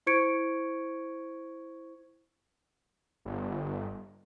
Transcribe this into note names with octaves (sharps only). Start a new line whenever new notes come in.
E4 C5 C#6 G#6 C#7 D7
G1